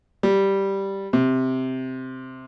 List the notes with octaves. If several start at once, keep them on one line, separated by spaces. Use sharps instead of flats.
G3
C3